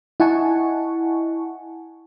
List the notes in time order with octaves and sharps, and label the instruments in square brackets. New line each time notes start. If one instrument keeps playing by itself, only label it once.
[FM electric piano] E4 D#5 F#5 G#5 A5 C#6